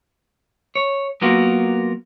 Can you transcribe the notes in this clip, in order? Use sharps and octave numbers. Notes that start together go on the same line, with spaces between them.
C#5
F#3 A#3 B3 F4 F#4 A#4